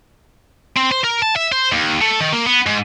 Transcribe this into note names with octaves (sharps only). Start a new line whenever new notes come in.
C4
C5
A#4
A5
E5
C5
D#2
A3
D#3
A#3
B3
G#2